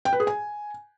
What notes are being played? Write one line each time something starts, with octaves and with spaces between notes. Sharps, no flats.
G5
B4
G#4
G#5